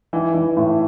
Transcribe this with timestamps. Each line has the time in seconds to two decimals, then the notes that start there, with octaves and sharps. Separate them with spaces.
0.13 E3
0.34 E3
0.57 A2